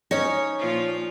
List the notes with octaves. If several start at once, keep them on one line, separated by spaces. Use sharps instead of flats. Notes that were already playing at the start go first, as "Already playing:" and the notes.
C#4 D#4 C#5
A#2 F3 F4